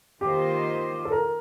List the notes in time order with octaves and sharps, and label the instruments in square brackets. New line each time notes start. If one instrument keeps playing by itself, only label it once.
[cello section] D#3 A#3 F4 C5 D#5 [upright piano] G4
[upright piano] A4
A#4